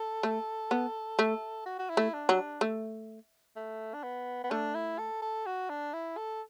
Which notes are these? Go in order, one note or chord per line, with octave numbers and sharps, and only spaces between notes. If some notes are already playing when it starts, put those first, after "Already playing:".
Already playing: A4
A3
B3
A3
F#4
F#4
E4
A3
D4
F#3
D4
A3
A3
D4
B3
B3
A3 D4
E4
A4
A4
F#4
D4
E4
A4